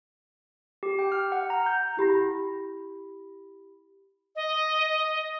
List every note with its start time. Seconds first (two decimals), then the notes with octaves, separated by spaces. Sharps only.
0.83 G4
0.99 G5
1.12 F6
1.32 F#5
1.50 A#5
1.66 G6
1.97 E4 G4 B5 A#6
4.36 D#5